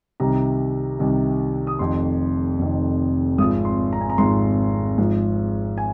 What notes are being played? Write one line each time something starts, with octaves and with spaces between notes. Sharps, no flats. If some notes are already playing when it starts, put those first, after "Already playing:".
C2 C3 D#3 A#5
C2 C3 D#3
D#6
F1 F2 D#3 C6
F1 F2 D#3
G#1 G#2 F3 D#6
C6
A#5
G#5
A#5
G#1 G#2 F3 C6
G#1 G#2 F3
G#5